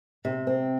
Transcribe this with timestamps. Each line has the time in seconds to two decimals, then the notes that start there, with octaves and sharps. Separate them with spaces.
0.25 C3
0.47 C4